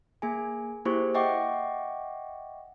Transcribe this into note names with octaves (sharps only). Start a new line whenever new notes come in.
A#3 G#4 G#5
A#3 E4 G4 G#4 C5 C#6
D#5 E5 F#5 G5 C#6 D6